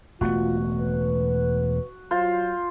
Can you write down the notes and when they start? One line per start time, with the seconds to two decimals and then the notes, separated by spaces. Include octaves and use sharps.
0.21 E1 A3 B3 F4 F#4
0.80 B4
2.11 F#3 F4 C5